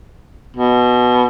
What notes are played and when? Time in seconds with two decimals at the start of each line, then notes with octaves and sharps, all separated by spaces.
0.57 B2